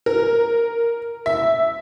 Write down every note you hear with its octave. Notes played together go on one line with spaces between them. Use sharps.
A#4
E5